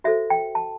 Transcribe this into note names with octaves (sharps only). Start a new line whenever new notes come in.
F#4 A4 C5 E5
G5
A5